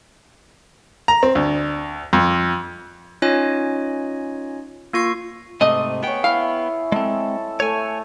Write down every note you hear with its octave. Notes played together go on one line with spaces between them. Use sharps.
A#5
C4
D2
F2
C#4 D#4 F4 C#5 D#5 G#5
A#3 F4 C#6 C7
G#2 C3 A3 D#5
B3 G#4 C#5 G5
E4 F5
G#3 C4 A4
A3 C#5 G#5